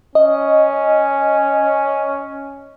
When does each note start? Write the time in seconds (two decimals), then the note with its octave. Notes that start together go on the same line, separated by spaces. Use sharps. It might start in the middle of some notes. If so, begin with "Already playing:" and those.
0.15 C#4 D#5